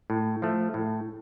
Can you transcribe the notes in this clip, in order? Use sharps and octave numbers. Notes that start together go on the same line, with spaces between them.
A2
F3 A3
A2